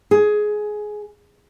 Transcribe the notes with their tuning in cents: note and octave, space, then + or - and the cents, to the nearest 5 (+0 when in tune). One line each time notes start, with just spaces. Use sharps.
G#4 +15